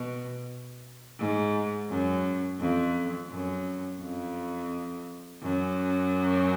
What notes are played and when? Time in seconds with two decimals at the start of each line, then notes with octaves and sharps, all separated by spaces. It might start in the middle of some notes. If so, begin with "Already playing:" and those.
Already playing: B2
1.19 G#2
1.89 F#2
2.60 F2
3.30 F#2
4.01 F2
5.42 F#2